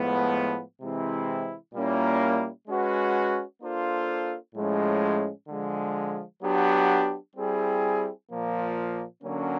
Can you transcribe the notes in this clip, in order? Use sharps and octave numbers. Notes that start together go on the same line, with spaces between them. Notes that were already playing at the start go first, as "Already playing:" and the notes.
Already playing: A2 F3 G#3 B3
C3 E3 G#3 C4 E4
A#2 G3 A#3 C#4 E4
G#3 C#4 F#4 B4
A#3 D4 F4 A4 C5
A2 F3 G#3 C#4
D3 F3 G#3
F#3 B3 D4 G4
G3 C4 E4 G#4
A#2 F3 A#3
D3 F#3 A#3 C#4